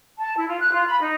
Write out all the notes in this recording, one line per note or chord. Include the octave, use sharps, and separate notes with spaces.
A5
E4
F4
F#6
F4
B5
D#4